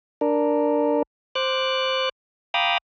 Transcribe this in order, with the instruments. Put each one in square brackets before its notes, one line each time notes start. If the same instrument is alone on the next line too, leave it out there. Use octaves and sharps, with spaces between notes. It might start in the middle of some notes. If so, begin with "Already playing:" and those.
[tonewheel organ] D4 A#4
C5 D6 F#6
F5 G5 A#5 B5 D6 D#6